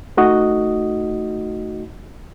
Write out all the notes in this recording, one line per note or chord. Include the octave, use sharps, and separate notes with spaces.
A3 D#4 F#4 D#5